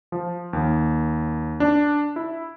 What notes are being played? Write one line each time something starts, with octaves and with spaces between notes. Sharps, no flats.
F3
D#2
D4
E4